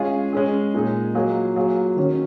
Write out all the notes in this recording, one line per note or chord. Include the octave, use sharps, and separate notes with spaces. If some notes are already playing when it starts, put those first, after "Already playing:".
Already playing: G#3 C#4 F4 G#4
G#3 C#4 G#4
A#2 G#3 D#4 G#4
F#3 A#3 F4 G#4
F#3 A#3 F4 G#4
D#3 F#3 C#4